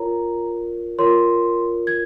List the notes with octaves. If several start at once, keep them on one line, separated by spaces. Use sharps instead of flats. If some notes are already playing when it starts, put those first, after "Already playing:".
Already playing: F4 A#4 C#5 A#5
F4 A#4 C#5 C6
G#6